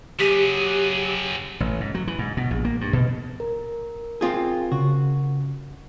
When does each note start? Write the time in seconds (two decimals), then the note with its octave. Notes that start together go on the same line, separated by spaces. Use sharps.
0.19 F#3 G4 G#4
1.60 A1
1.80 G#2
1.95 F#3
2.07 E3
2.19 G#2
2.37 B2
2.51 A#1
2.65 A#3
2.81 G2
2.93 B2
3.40 A#4
4.21 C4 F4 G#4
4.72 C#3 F#4